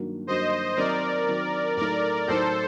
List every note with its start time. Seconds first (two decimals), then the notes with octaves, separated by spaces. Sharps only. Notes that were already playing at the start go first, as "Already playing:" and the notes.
Already playing: G2 D#3 F#3 A#3 F#4
0.27 G2 D#3 F#3 A#3 F#4 C5 D#5
0.77 D#3 F#3 C4 A#4 D5
1.28 D#3 F#3 C4
1.77 A2 F#3 A3 D#4 A#4 D5
2.28 A2 F#3 A3 D#4 A4 C5